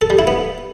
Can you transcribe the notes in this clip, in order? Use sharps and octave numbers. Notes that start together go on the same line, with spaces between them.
A4
G3
E4
B3